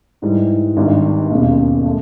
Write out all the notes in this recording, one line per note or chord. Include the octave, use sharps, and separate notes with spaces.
G#2 E3 G3
G#1 G2 D#3 G3
E1 D#2 C#3
A3